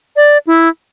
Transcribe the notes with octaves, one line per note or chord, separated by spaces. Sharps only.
D5
E4